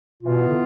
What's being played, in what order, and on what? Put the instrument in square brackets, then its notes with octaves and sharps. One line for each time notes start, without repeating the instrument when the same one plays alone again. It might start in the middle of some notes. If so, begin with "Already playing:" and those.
[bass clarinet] B2 [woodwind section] E3 B3 F4
[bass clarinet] D3